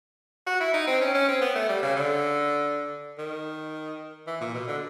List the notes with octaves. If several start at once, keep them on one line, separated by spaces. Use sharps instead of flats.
F#4
E4
D#4
C4
C#4
C#4
C4
B3
A3
G3
C#3
D3
D#3
E3
A#2
B2
D3